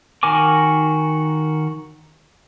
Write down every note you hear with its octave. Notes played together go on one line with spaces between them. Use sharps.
D#3 F#4 A#4 G#5 D6